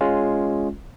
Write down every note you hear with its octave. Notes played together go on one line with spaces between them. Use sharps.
G#3 C#4 F4